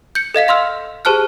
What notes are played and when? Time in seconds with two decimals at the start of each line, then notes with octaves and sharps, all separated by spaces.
0.15 G6 C#7
0.35 A4 D#5 F5 B6
0.48 F5 C6 E6 F6
1.05 G4 G#4 C5 A5 F6 F#6